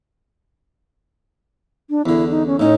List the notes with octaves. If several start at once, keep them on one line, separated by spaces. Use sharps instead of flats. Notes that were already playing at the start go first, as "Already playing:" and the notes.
D4
E2 D3 E4
D#4
C#4
A2 C#4 D#4